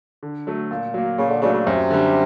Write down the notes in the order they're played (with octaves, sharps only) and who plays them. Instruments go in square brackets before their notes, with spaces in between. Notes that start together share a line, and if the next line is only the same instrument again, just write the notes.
[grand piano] D3
F#3 A3
A#2
F#3 A#3
[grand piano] A#2 [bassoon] C#3
[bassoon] D3
[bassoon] C#3 [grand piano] F#3 A3 D4
[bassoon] C#3
[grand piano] F#2 [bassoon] C3
[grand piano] D3 G3